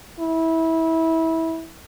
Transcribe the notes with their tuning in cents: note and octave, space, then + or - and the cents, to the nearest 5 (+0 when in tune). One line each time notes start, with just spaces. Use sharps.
E4 -20